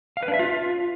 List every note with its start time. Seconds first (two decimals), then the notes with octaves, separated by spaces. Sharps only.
0.17 F5
0.22 B4
0.28 D4
0.34 E5
0.39 F4